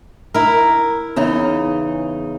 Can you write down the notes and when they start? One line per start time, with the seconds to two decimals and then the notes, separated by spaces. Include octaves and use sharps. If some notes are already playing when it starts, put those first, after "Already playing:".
0.34 E4 A#4
1.16 E2 C#3 D#4